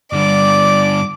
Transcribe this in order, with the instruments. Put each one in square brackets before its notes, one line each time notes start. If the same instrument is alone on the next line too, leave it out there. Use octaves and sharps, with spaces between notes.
[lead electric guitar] G2 D3 [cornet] D5 [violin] D6